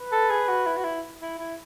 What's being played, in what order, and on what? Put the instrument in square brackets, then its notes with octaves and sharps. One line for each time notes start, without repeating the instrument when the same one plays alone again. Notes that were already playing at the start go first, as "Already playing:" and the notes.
Already playing: [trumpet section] B4
[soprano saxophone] A4
G#4
F#4
E4
F#4
E4
E4
E4